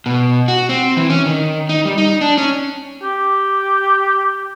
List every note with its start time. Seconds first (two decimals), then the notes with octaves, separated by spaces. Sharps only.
0.06 B2
0.48 F#4
0.69 C4
0.97 E3
1.10 C#4
1.26 D#3
1.69 D#4
1.85 G3
1.98 D#4
2.21 D4
2.38 C#4
3.03 G4